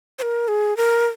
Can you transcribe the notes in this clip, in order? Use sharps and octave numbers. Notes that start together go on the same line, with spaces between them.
C5
A#4
G#4
A#4